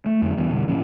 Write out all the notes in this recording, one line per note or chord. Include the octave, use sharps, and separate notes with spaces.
A3
F2 D3 F3 F#3
E2 E3 G3 B3
B2 D3 G3
A2 F3 A#3 C#4